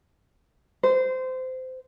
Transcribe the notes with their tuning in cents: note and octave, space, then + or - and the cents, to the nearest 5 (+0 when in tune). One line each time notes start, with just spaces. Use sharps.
C5 -20